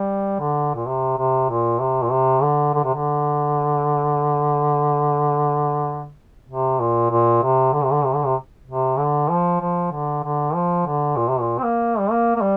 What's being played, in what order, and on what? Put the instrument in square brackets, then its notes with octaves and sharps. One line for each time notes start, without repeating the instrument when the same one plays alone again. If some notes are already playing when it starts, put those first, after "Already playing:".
Already playing: [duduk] G3
D3
A#2
C3
C3
A#2
C3
A#2
C3
D3
D3
C3
D3
C3
A#2
A#2
C3
D3
C3
D3
C3
D3
C3
C3
D3
F3
F3
D3
D3
F3
D3
A#2
C3
A#2
C4
A#3
G3
A#3
A#3
G3